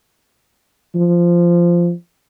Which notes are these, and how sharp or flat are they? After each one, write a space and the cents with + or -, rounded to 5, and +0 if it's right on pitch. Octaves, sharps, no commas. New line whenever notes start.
F3 -10